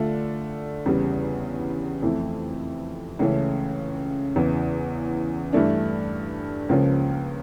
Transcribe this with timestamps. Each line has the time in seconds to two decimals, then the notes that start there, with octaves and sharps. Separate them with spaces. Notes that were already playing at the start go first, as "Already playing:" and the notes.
Already playing: D3 A3 D4 F4
0.86 E2 C#3 G3
2.02 F2 E3 A3 E4
3.19 C#2 C#3 E3 A3 C#4
4.36 E2 C#3 E3
5.53 G2 E3 A3 D4
6.69 C#2 C#3 F3 A#3 C#4